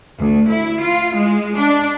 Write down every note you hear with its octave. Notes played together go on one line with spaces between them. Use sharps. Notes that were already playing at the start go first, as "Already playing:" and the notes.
D2
E4
F4
G#3
D4